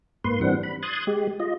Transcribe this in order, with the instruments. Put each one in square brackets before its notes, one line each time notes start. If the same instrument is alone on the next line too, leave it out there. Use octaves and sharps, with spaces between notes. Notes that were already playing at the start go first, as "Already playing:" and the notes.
[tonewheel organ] G#2 A#3 B4 C6
E3 G3 C4 D4 F#5
B5
C6 D#6 F#6 G#6 A6
G#3 G4
F4 D#5